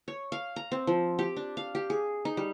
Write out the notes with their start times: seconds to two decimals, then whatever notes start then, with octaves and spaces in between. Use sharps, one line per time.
0.08 C#5
0.32 F5
0.56 A#5
0.72 C4
0.87 F3
1.19 G4
1.36 D4
1.57 F5
1.75 G4
1.90 G#4
2.25 D#4
2.37 G3